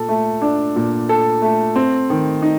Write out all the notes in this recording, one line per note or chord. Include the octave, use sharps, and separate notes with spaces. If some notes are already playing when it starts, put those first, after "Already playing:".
Already playing: A#2 A4
A3
D4
A#2
A4
A3
C4
D#3
D#4